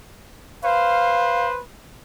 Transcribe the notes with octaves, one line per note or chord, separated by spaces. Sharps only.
B4 C5 F5